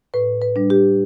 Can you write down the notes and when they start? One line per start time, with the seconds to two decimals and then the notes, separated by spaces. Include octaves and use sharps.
0.14 A2 B4
0.42 B4
0.56 G3 D4
0.70 G4